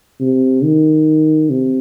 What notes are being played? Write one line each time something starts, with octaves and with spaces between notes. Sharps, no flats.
C3
D#3
C3